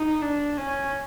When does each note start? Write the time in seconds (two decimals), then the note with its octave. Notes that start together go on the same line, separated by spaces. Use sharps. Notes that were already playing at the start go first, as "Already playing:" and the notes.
Already playing: D#4
0.22 D4
0.57 C#4